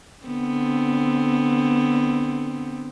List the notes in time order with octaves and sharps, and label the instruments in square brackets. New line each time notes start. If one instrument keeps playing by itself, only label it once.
[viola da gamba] D3 B3 C4